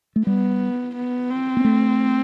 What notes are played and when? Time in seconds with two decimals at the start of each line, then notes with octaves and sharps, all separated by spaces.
0.16 A3
0.26 G3 B3
0.96 B3
1.30 C4
1.57 B3
1.64 A3